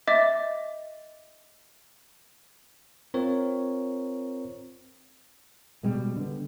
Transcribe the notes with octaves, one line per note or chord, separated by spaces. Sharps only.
D#5 E5 D6 A6
C4 F4 A#4 C#5
B2 G3 G#3
D3 B3